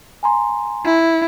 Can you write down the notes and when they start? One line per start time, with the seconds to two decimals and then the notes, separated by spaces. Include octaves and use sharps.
0.23 G#5 A#5 C6
0.85 E4